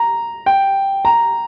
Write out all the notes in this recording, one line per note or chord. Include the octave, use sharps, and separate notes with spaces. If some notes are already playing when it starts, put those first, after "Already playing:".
Already playing: A#5
G5
A#5